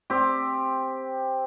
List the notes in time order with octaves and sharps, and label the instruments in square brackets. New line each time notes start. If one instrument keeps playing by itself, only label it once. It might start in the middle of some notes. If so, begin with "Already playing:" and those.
[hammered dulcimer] C4 G4